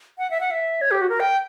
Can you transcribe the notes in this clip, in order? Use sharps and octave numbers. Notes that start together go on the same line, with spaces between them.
F#5
E5
F#5
E5
C#5
G4
F#4
A#4
G5